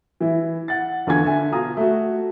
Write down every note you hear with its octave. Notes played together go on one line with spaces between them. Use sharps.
E3 E4
F#5 A6
E2 D3 F4 G#5 C#6 G#6
D3 E5 G#5
B2 F4 F5 A#5 D#6
A3 F#4